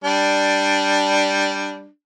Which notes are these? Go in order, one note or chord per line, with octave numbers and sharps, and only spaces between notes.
G3 D4